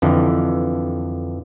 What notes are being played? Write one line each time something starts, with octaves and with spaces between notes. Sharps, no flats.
F2 D3 E3